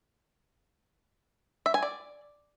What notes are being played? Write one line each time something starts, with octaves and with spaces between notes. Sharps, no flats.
E5
G#5
D5